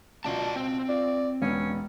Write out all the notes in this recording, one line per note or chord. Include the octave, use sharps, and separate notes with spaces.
C#2 B2 F4 D5 A5
C4
F4 D5
E1 G#3 B3 C#4